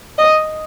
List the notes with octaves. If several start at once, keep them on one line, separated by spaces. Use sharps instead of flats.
D#5